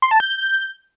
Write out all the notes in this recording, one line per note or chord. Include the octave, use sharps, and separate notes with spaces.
C6
A5
G6